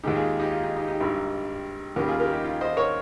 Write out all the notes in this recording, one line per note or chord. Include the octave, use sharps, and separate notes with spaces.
D#2 D#3 G#3 D#4 G4
F4 G#4
D#4 G4
F4
D#4
D#4 G4
D#4 G4
G#1 G2 G3
D#2 C#3 G3 G4 A#4
F4 G#4
G4 A#4
D#4 G4
F4
C5 D#5
A#4 C#5